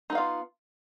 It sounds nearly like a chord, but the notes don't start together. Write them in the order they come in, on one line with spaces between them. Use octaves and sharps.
D#4 B3 F5 F4